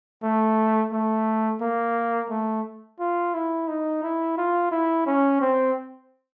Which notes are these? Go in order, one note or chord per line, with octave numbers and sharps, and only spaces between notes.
A3
A3
A#3
A3
F4
E4
D#4
E4
F4
E4
C#4
C4